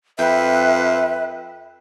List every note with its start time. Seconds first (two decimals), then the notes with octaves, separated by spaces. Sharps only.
0.19 F2 B4 E5 G5